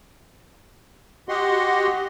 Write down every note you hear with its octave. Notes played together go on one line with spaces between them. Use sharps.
F#4 G4 D#5 F#5 C6